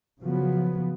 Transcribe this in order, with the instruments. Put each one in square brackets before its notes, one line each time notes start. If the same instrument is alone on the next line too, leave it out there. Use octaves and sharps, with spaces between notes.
[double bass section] C#3 F3 F#3 B3